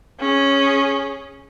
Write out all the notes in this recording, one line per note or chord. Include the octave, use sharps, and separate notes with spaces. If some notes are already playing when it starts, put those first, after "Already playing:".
C#4 G#4